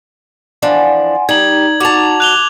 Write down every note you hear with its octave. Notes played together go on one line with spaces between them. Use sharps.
E3 F3 D4 F#5 G#5 C6
G3 D#4 A#5 G#6 F#7
F#4 A5 D6 F7
F#6 F7 G7